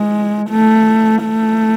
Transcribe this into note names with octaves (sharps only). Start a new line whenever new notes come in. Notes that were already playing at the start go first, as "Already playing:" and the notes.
Already playing: G#3
A3
A3